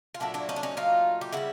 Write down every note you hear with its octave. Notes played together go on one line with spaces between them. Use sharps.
F4
A#2 F#3 A3 D4 E4
D4 E4
C#4 D#4
D4
C#4 D#4
D#4 F4
G4
C#3 E3 G3 E4 F#4